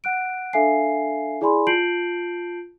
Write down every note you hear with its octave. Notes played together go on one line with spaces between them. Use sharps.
F#5 F#6 D7
D4 A4 E5 F5 G#5 C7
E4 G#4 D5 G#5 B5 C6
F4 A5 G6 C7 D7 F#7